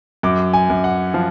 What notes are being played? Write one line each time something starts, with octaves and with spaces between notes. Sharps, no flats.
F#2 D6
G#5
F#2
F#5
F3